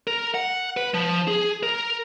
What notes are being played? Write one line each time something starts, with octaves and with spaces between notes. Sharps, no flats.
A#4
F#5
B4
F3
G#4
A#4